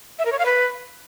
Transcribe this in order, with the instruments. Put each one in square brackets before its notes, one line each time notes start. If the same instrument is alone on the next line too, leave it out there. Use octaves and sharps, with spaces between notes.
[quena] E5
A#4
C#5
F5
B4